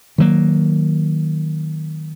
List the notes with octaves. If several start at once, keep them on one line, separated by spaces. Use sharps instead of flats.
D#3 F#3 A#3